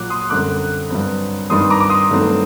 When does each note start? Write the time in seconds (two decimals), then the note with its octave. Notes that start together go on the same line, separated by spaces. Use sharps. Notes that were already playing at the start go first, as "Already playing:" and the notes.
Already playing: A#1 A#2 F#3 D6 F#6
0.10 C6 D#6
0.30 F#2 D3 G3 C4 D6 F#6
0.90 G2 F#3 C4
1.50 G2 D#3 G3 C4 C6 D#6
1.70 A#5 D6
1.80 D6
1.89 C6 D#6
2.10 G2 D#3 F#3 A3 C4